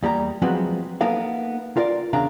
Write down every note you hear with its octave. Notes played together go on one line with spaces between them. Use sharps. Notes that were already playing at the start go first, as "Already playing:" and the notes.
E2 G3 A#3 A#5
F3 F#3 G#3 B3 C4 F#4
A#3 B3 D#4 A4 A#4 F5
F4 A#4 D5
E2 C#3 D4 F5 A#5